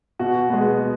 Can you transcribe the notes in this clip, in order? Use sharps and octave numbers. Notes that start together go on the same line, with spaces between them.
B2 F#4
G#3 B3